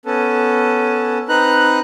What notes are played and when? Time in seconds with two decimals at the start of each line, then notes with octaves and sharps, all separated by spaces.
0.06 B3 C#4 A4
1.29 C4 D#4 B4 A#5 F#6